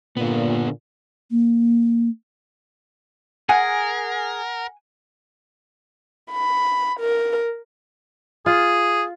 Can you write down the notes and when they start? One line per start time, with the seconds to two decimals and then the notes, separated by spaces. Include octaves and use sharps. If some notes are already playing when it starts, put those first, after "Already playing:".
0.17 A#2 D3 B3
1.31 A#3
3.49 G#4 A#4 F#5 G#5
6.32 B5
6.99 A#4
8.46 F4 G#4